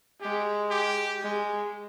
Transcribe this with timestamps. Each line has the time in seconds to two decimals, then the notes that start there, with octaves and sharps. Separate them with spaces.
0.21 G#3 G4
0.71 G4
1.20 G#3